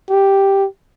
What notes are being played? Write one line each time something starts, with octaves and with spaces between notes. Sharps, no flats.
G4